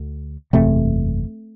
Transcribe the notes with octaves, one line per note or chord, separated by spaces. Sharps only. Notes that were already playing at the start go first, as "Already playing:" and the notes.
Already playing: D2 D3
F#1 E2 C3 A3 C4